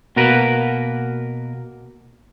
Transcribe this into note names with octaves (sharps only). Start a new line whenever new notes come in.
B2 A#3 F#4 A#4 B4